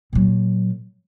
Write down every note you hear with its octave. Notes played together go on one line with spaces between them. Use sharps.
A#2 F#3